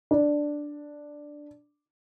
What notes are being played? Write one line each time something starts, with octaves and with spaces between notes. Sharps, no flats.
D4